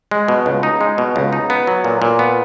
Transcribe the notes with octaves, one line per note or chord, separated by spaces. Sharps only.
G#3
B2
C#2
D#4
G#3
B2
C#2
D#4
B3
F#3
A#2
A#2
B3